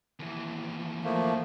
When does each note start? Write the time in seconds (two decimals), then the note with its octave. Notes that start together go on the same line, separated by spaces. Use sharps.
0.19 D#2 E3
1.04 F3 A3 A#3